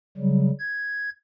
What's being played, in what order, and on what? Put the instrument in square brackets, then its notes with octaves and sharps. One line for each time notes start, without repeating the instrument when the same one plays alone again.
[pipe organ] C#3 F#3 G3
G#6